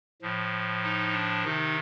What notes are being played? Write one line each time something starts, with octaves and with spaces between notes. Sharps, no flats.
A2 F3
D#4
D4
C3 D#3 D#4